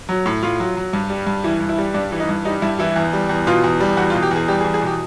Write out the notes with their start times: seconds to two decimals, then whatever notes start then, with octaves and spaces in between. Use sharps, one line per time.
0.09 F#3
0.26 A2
0.43 A2 F4
0.60 F#3
0.77 F#3
0.93 G2
1.10 G3
1.27 G2
1.44 E3 E4
1.60 G2
1.69 E4
1.78 G3
1.94 G2 D4
2.12 E3
2.20 D#4
2.29 G2
2.45 G3 D#4
2.62 G2 E4
2.79 E3 E4
2.96 E2
3.13 G3
3.29 E2
3.47 B2 F4
3.64 E2
3.80 G3
3.97 E2 F#4
4.10 F4
4.14 B2
4.23 G4
4.31 E2 G#4
4.48 G3 G4
4.61 G#4
4.64 E2
4.74 G#4
4.82 B2 G4